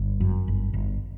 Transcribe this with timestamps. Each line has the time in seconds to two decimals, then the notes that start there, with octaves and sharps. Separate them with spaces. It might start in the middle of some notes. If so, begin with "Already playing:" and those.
Already playing: G1
0.20 F#2
0.48 G1
0.74 G1